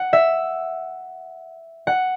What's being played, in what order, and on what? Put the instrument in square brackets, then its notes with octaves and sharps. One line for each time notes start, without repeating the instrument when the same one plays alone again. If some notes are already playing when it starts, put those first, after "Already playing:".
Already playing: [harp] F#5
E5
F#5